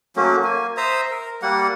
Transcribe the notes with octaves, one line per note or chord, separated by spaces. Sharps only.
F#3 A3 A#3 C#4
A#3 G#5
C5 E5 A#5 D#6
A#4
G3 A#3 F#5